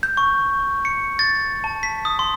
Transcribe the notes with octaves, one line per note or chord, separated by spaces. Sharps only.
G6
C#6
C#7
A6
A5
B6
D#6
C6